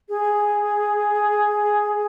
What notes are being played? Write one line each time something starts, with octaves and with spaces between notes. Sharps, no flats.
G#4